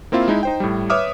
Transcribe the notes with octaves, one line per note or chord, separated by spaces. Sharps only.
A#3 C4 E4 F4
G#3 D#4 E4
D#4 C5 G5
A2 G3
B4 C#5 E5 D6 D#6 F6